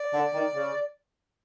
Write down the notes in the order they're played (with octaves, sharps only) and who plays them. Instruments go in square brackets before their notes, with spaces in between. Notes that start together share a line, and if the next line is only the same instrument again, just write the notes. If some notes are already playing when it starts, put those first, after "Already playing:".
Already playing: [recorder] D5
[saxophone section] D3
D#3
C#3